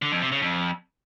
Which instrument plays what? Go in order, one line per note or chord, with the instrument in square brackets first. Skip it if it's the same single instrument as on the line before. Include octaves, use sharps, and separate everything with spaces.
[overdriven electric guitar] D3
F2
C3
C#3
F2